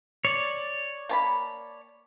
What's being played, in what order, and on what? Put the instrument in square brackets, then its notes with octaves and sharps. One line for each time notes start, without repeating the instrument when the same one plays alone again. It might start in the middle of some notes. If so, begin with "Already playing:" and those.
[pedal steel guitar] C#5 D5
[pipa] A#3 A5 B5